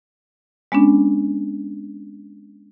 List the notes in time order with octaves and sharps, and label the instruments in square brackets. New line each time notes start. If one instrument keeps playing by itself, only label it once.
[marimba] G#3 B3 C#4 D4